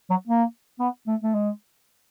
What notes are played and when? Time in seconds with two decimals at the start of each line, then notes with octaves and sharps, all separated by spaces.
0.10 F#3
0.27 A#3
0.80 B3
1.07 A3
1.23 A3
1.34 G#3